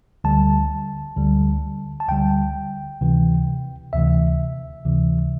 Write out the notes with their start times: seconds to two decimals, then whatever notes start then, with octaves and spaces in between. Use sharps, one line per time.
0.24 D2 D3 G3 A5
1.17 D2 D3 G3
2.00 A5
2.09 D2 D3 G3 G5
3.01 D2 C3 E3
3.93 D2 C3 E3 E5
4.85 D2 C3 E3